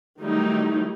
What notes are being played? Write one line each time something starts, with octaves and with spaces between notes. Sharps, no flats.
D#3 F#3 G3 A3 D#4 E4